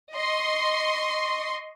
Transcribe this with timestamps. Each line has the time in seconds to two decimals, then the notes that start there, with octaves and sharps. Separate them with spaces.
0.15 D#5 C6 C#6